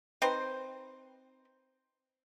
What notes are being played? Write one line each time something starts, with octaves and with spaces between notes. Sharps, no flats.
C4 D#4 B4 C5